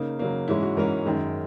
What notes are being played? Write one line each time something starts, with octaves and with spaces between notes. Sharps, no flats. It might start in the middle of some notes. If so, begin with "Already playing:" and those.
Already playing: C#3 A#3 D#4
C#3 F#3 A#3
G#2 E3 G#3 C#4 E4
F#4
G#2 E3 G#3 C#4 A#4
F#2 D#3 G#3